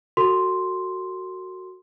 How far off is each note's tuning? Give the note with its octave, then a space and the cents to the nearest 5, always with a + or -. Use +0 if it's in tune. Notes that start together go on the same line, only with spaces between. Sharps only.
F#4 +5 A4 +40 C6 +0